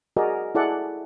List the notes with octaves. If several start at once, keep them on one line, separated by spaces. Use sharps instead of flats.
F#4 G#4 A#4 D5 D#5
E4 G#4 A4 D5 F#5